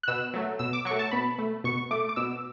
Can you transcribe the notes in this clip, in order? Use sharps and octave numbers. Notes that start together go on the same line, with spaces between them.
F#6
B2 E6
F#3 A3
B2 E6
D6
F#3 C#6
A3
A5
B2 B5
A3
B2 C#6
A3 D6
D6
B2 E6